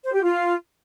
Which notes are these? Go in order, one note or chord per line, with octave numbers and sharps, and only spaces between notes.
C5
G4
F4